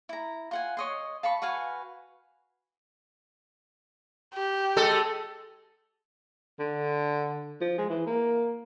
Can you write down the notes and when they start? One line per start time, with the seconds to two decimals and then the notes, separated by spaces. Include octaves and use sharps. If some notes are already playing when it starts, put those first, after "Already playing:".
0.09 E4 A#5
0.51 F4 F#5 G#5
0.77 C#5 D#5 C6
1.23 F5 A5 B5 C#6
1.42 F#4 B4 F5 G#5
4.34 G4
4.77 G#3 A4
6.59 D3
7.61 F3
7.78 G#3
7.90 E3
8.06 A#3